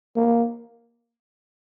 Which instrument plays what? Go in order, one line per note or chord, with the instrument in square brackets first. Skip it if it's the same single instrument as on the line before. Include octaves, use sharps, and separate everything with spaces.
[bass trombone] A#3